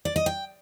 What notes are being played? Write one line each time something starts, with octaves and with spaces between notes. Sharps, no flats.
D5
D#5
G5